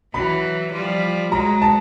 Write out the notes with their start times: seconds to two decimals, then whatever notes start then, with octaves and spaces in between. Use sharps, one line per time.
0.14 E3 F#3 B5
0.73 F3 G3
1.32 F#3 G#3 A#5
1.62 A5